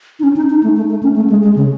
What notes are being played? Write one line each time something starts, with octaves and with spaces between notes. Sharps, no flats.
D#4
C#4
D#4
D#4
A3
A3
A3
C#4
A3
G#3
G#3
C#3